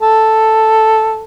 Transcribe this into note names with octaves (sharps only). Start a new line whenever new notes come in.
A4